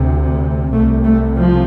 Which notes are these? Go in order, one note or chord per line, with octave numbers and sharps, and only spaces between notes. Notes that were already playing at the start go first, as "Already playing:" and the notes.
Already playing: D2 C3
C2 C3 A3
A3
F3